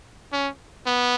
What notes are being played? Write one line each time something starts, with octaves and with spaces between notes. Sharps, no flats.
C#4
B3